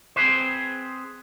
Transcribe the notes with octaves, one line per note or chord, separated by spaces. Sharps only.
C4 G#4 B4 C5